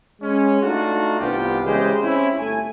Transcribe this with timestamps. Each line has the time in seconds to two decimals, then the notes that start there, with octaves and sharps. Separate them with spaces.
0.21 G#3 C#4
0.61 A3 D4 D#4 F4 F#4
1.20 C2 G2 B3 F4 G4
1.65 C#3 E3 G#3 G4 C5
2.02 C4 C#4 E4
2.39 G1 A3 G#5